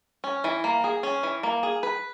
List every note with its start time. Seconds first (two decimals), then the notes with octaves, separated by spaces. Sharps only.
0.24 C#4
0.44 E3
0.64 A#3
0.84 G#4
1.03 C#4
1.23 E3
1.43 A#3
1.63 G#4
1.83 B4